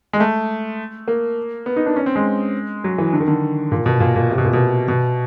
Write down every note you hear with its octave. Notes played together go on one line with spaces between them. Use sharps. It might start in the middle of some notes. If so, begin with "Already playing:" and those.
G#3
A3
A#3
B3
D#4
D4
C#4
C4
G#3
F#3
E3
D3
D#3
D3
A#2
B2
A#2
A#2
C3
B2
A#2
B2
B2